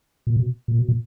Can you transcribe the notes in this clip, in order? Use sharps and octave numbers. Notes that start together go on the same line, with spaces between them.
A#2
B2
A#2
B2
A#2